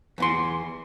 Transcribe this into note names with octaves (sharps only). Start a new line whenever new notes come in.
E2 E3 C6